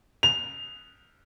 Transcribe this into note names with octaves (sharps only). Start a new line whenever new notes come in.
F7